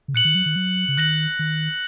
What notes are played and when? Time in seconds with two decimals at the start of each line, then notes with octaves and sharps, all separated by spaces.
0.08 C#3
0.14 A#2 F#6 C#7 F#7
0.25 D#3
0.35 F#3
0.46 D#3
0.56 F#3
0.88 C#3
0.97 D#3 F#6 A#6 F#7
1.39 D#3